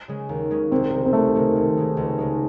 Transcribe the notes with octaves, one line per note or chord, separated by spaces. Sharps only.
C#3 G#3 C#4
D#2
C#3 G#3 C#4
C2 C4
C3 D#3 G#3
C4
C2 A3
C3 D#3 G#3
C#2
C#3 G#3 D#4
C#2
C#3 G#3 D#4